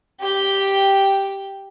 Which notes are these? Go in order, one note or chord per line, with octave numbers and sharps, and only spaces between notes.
G4 G5